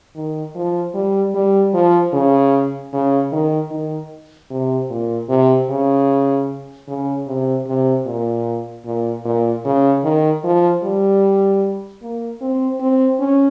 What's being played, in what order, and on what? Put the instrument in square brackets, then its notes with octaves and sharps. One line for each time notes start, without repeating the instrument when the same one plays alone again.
[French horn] D#3
F3
G3
G3
F3
C#3
C#3
D#3
D#3
C3
A#2
C3
C#3
C#3
C3
C3
A#2
A#2
A#2
C#3
D#3
F3
G3
A#3
C4
C4
C#4